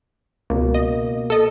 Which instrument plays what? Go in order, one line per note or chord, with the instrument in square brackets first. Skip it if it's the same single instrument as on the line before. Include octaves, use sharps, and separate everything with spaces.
[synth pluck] C#2 [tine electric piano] B2 A#3
[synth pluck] D#5
A4 D#5